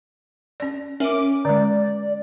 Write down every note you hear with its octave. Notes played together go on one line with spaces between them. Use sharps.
C#4 D5
C#4 A#4 E5 D6
D3 G#3 D5